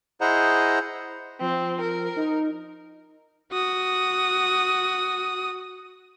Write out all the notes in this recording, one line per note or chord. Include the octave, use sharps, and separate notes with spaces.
E4 G#4 C5 D#5 F#5 A#5
F3 C4
A#4
D#4
F#4 D#6